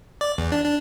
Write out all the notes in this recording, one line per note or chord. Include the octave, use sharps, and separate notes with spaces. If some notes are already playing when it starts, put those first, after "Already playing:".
D5
E2
D4
D4